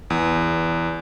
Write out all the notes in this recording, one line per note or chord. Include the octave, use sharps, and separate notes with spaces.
E2